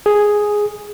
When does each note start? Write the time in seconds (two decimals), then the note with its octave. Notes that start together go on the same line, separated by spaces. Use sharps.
0.06 G#4